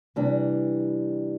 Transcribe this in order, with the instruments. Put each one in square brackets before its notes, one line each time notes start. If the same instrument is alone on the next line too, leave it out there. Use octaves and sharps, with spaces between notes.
[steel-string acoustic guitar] C3 E3 G3 D4